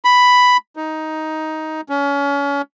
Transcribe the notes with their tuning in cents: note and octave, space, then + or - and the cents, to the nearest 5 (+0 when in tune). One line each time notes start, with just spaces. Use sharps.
B5 +5
D#4 +10
C#4 +30